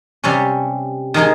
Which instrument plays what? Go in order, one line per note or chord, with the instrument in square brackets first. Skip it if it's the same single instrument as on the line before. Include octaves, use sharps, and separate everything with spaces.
[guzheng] C3 G3 C#4
D#3 G#3 D#4 G#4